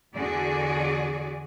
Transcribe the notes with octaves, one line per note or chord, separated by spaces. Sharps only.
E2 D3 F#4 G#4 D5